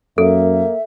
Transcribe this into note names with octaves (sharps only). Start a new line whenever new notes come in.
F#2 A#3 A4 E5